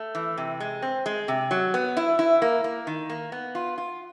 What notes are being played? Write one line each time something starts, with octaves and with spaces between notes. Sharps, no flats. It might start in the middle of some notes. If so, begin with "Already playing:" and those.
Already playing: A3
E3
C3
G#3
C4
G#3
C3
F#3
B3
E4
E4
A#3
A#3
D#3
A#3
B3
F4
F4